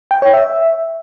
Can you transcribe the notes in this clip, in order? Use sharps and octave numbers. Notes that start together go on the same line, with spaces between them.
G5
C#5
E5